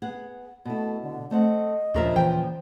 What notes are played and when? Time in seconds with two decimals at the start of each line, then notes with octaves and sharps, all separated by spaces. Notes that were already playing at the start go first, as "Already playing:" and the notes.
0.02 B3 G#4 F#5
0.65 B2 A3 E4
1.03 D3
1.31 A3 C4 D#5 F#5
1.94 D#2 A#2 C#3 F3 D4 A#4 E5
2.16 E3 C5 G5